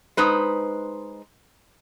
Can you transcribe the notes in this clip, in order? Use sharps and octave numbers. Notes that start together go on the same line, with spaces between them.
G#3 D#4 B4 C5